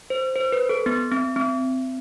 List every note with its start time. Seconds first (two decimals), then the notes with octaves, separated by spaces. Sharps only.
0.10 C5
0.36 C5
0.52 B4
0.69 A4
0.86 B3
1.12 C4
1.36 C4